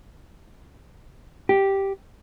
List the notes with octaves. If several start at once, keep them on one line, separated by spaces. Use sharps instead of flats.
G4